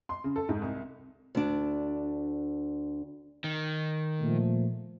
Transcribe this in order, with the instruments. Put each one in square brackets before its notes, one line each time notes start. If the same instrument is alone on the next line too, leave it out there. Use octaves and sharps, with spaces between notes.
[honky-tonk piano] C6
C#3
A4
G#2
C2
[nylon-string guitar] D2 D4
[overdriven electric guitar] D#3
[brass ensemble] A#2 F3 A3